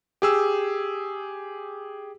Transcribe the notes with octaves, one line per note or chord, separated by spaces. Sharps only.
G4 G#4 E6